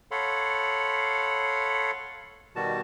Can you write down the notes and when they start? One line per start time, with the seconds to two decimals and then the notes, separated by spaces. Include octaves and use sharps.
0.11 A4 C#5 F5 F#5 B5 C6
2.56 B2 D#3 G3 F#4 A5